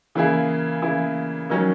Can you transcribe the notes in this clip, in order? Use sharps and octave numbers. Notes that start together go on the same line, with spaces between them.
C#3 E3 A#3 E4 G#4
C#3 E3 A#3 E4 G#4
D#3 F#3 C#4